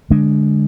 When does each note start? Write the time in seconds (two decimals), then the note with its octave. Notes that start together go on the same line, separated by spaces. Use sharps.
0.10 D3 G#3 D4